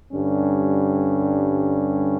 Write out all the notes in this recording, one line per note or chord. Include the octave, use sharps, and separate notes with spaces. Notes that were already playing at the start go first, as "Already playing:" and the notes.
G2 D3 G3 C#4